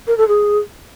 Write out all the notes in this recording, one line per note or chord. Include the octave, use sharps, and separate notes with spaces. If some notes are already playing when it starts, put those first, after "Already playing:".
A#4
A4
G#4